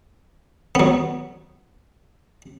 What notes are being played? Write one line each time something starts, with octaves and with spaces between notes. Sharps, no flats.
F#3 B3